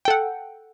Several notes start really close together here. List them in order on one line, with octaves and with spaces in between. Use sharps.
G5 A4 F#5